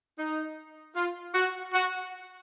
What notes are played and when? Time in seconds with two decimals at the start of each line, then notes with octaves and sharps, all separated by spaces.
0.19 D#4
0.95 F4
1.35 F#4
1.74 F#4